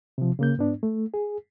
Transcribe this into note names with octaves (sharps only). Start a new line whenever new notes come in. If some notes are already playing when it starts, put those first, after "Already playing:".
C3 F3
C#3 A#3 G6
G#2 B3 D4
A3
G#4